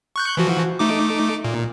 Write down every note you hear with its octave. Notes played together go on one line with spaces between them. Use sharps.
C#6 F#6 G6
E3 F3 F#4
A3 D#4 D6
A#2